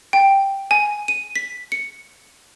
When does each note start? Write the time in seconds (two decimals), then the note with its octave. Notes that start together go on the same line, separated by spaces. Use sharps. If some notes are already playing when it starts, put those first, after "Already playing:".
0.13 G5
0.71 G#5
1.08 D#7
1.35 B6
1.72 C#7